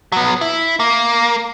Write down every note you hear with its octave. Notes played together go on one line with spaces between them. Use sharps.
F#3 B3
E4
A#3